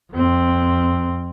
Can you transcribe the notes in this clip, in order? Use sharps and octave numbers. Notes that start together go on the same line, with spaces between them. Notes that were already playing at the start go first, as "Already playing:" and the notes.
F2 C4